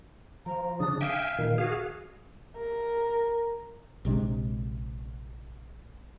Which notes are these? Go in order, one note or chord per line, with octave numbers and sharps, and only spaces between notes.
F3 A#5
C#3 D4 D#6
E5 F5 G5 G#5
A#2 D#3
F#4 G#4 F5
A#4
A#1 C3 G#3 D4